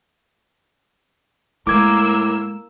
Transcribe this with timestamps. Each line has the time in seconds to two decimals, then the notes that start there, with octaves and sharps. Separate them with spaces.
1.67 A2 G3 G#3 A#3 D6 E6 G#6